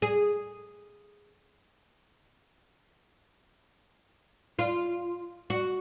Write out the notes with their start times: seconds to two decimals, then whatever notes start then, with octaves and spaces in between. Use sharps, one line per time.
0.02 G#4
4.59 F4
5.50 F#4